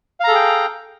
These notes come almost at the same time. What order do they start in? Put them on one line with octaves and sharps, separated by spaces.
F5 A#5 A4 G#4 G5